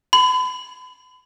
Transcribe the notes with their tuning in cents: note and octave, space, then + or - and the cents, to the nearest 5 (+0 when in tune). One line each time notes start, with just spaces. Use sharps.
B5 +40